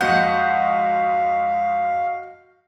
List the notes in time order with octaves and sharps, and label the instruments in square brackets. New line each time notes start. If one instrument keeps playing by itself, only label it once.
[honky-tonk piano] F2 G#2 C#7 [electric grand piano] F#4 D#5 G6 [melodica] F5 [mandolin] F#5